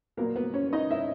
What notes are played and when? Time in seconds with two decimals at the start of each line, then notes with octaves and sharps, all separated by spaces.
0.17 A#2 F#3 A#3 B3 A#4
0.36 B3 B4
0.54 C#4 C#5
0.73 D#4 D#5
0.91 E4 E5